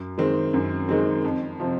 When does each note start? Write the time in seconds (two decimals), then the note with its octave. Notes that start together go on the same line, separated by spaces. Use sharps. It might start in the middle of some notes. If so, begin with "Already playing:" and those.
Already playing: F#2
0.18 D#3 G#3 C4
0.54 F#2
0.89 D#3 G#3 C4
1.24 F2
1.60 C3 F3